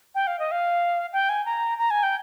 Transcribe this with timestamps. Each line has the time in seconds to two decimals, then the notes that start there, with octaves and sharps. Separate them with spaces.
0.15 G5
0.27 F5
0.39 D#5
0.51 F5
1.13 G5
1.29 G#5
1.45 A#5
1.78 A#5
1.90 G#5
2.03 G5